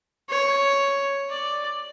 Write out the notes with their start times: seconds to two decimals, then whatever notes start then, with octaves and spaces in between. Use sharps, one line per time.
0.29 C#5
1.30 D5